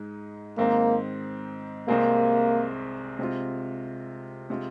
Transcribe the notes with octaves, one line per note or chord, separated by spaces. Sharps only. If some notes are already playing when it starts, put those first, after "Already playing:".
Already playing: G#2 G#3 D#4
G#2 D#3 A#3 C4 D#4
C2 C3 G#3 A#3 C4 G#4
C3 G#3 C4 F4
C3 G#3 F4